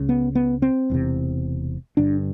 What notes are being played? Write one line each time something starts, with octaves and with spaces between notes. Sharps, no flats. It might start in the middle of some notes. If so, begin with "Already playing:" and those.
Already playing: C#2 C#3
B3
B3
C4
E1 E2 C3
G1 G2 D3 D4